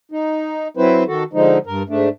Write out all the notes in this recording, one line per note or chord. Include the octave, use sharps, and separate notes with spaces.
D#4
F#3 C4 E4 B4 C5
D#3 F#4 A4
D3 F3 G#3 D#4
G2 A#4
G#2 A3 D4